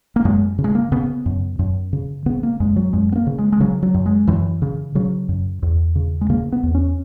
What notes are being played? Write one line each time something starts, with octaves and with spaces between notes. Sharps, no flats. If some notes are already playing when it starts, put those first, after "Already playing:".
A#3
F#2 G#3
C#3
G#3
A#3
C#3 B3
F#2
F#2
C#3
C#3 B3
A#3
F#2 G#3
F#3
F#2 G#3
B3
A#3
C#3
G#3
G#3
C#3 F#3
F#3
F#2
G#3
F#2 E3
C#3
C#3 F#3
F#2
E2
C#3
G#3
C#3 A#3
B3
E2
C#4